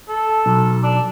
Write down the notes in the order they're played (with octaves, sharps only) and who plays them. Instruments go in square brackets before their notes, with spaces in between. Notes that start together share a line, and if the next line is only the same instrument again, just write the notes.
[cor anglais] A4
[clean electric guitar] B1
[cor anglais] D4